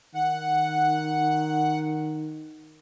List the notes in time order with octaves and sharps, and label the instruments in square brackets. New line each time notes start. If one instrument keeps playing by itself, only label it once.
[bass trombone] D#3 [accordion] F#5